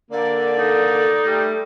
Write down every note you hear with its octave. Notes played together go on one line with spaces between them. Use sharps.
D3 A#3 D5
D#4 A4
G3 A3